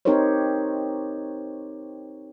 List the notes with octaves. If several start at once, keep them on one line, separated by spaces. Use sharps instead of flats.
C4 D#4 G4 A#4 C5 C#5